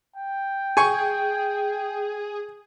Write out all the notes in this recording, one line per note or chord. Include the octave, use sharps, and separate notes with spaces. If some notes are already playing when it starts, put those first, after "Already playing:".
G5
G#4 G#5 C#6